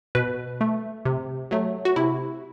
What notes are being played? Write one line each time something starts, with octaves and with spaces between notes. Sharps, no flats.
B2 B4
A3
C3
F#3 A3
F#4
C3 E4